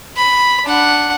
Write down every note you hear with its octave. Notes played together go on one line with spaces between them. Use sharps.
B5
D4 F#5